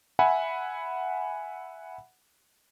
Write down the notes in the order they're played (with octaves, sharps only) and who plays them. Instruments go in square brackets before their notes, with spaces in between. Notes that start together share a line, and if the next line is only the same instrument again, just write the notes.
[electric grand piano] E5 F#5 G#5 B5